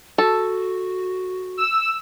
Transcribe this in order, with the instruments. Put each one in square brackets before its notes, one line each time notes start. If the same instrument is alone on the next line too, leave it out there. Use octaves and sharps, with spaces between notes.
[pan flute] F#4 [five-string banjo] A4
[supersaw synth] E6